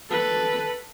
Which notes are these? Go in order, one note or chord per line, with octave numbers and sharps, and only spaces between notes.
A4 B4